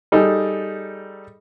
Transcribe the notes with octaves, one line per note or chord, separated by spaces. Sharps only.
G3 D#4 G#4 A4